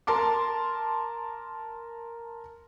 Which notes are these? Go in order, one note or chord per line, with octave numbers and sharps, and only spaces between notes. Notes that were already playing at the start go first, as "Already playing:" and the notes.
A#4 A5 C6 D6